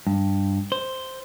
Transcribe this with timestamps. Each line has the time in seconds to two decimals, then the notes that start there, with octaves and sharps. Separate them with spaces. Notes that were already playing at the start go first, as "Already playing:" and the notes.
0.07 G2
0.72 C5